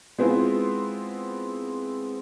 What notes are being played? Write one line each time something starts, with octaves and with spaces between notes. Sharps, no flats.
G#3 B3 C4 E4 F4